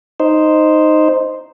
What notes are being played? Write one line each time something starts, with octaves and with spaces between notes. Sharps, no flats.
D#4 C5